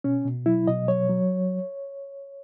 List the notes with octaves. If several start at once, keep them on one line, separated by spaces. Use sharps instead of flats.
B2 C#4
B2
F#3 E4
B2 D#5
F#3 C#5
F#3